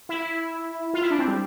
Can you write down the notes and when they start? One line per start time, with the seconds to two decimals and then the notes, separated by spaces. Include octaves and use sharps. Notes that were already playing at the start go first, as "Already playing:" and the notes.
0.09 E4
0.94 F4
1.02 E4
1.11 D4
1.19 C4
1.28 G3